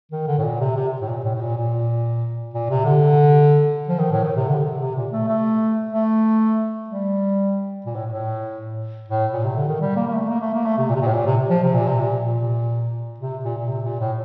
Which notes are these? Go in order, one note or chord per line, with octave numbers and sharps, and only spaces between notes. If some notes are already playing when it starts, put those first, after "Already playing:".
D#3
D3
A2
A#2
C3
C3
A2
A#2
A2
A2
A#2
A#2
A#2
C3
D3
F3
D#3
A2
D#3
C3
D3
C3
C3
A#2
A3
A3
A3
G3
A#2
A2
A2
A2
A#2
C3
D3
D#3
G3
A#3
A#3
A3
A#3
A3
A#3
A3
C3
A#2
C3
A#2
A2
A#2
C3
F3
C3
A#2
C3
A#2
A#2
C3
A#2
A#2
C3
A#2
A2